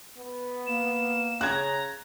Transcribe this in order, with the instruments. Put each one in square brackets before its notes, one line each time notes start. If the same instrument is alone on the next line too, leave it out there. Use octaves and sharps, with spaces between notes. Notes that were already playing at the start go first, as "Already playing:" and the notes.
[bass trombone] B3
[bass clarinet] A#3 [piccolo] E7
[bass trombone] C#3 [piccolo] A#5 [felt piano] F#6 G#6